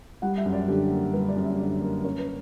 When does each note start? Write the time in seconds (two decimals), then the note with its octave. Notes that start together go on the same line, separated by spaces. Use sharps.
0.22 G3 F#5
0.38 E5
0.46 F#2
0.53 D5
0.68 D3 G4
0.90 A#3
1.13 G3 B4
1.29 D5
1.36 F#2
1.44 E5
1.59 D3 D5
1.81 A#3
2.04 C#4 C#5
2.18 B4